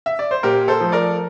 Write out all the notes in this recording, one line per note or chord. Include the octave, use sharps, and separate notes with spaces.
E5
D5
C5
A#2 G4 A#4
A4 C5
F3 A3
A#4 D5